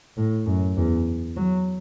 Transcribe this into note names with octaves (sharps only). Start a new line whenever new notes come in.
A2
F#2
E2
F#3